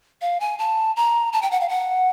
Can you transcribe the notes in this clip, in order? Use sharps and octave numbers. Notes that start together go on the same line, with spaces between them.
F5
G#5
A5
A#5
A5
G5
F#5
F5
F#5